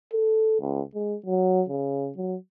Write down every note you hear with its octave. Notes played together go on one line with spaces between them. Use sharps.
A4
C#2
G#3
F#3
C#3
F#3